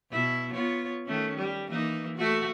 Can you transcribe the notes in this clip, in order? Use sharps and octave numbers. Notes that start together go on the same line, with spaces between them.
B2 E4
B3 F4 C#5
D#3 A3 C#4
G3
E3 A#3 D#4
A3 F#4